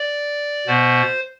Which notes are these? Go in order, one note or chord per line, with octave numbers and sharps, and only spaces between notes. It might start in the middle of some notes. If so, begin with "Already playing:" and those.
Already playing: D5
B2 B3 C5